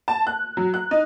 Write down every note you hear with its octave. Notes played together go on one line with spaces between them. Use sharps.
A5
F#6
F#3
F#6
D#4